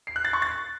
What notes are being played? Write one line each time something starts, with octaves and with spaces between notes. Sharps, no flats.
C7
F#6
A6
C#6
A6